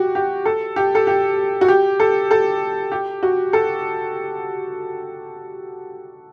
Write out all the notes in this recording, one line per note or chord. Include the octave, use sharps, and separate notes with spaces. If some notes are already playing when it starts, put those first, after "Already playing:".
Already playing: F#4 G4
G4
A4
G4
A4
G4
F#4
G4
A4
A4
G4
F#4
A4